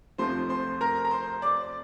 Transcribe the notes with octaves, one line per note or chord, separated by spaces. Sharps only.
F2 C3 F3 A3 C4 C5 C6
C5 C6
A#4 A#5
A#5
C5 C6
D5 D6